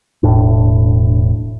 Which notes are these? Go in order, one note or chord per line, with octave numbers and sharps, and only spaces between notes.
E1 A2 D4